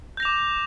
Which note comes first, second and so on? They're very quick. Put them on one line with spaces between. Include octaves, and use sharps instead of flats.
G6 A#6 F7 D6